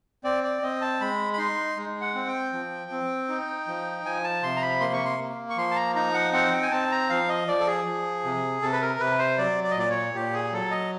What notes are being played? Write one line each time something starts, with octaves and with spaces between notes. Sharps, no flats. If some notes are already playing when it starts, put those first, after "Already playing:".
C4 D5
D5
C4 D#5
A5
G#3 B5
B5
D#4 C6
G#3
F#5
C4
G5
F3
C4
D#4
F3
F3 G#5
A5
C3 C6
A#5
B5
A#3 C6
C#6
C6
A#3
C#6
F3 C6
A5
A#5
D#4 A#5
F#5
C4 F#5
G5
G#5
C4 A5
A#5
F3 F5
D#5
F3 D5
A4
G#4
F3
C3
C3 A4
B4
A#4
C3 B4
C5
F#3 D5
D5
D#5
A#2 D5
C#5
A#2 G4
G#4
F#3 A4
D#5